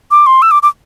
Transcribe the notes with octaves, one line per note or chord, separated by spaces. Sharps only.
D6
C6
E6
D6
D6